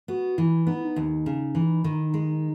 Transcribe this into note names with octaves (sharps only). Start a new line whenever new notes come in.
B3 F#4
E3 E4
B3 D#4
E4
D#4
D#2
C#3
E3
D#3
G#3